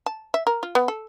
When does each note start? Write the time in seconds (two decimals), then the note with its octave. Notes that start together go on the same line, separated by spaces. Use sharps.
0.06 A5
0.34 E5
0.47 A#4
0.63 F4
0.75 B3
0.88 A4